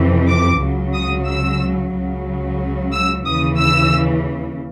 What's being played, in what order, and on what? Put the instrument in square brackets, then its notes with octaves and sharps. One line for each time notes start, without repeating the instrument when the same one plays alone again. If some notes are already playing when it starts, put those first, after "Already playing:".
Already playing: [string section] F2 C3 E3
D6
C#2 C#3 F#3
D#6
E6
C#2 C#3 F#3
E6
D#2 C#3 E3 D#6
E6